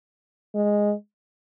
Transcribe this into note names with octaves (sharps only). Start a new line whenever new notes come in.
G#3